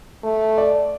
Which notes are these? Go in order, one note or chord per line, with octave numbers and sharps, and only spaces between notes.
A3
D5